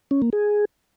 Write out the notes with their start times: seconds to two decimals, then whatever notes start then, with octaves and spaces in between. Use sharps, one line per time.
0.11 C#4
0.22 A#3
0.33 G#4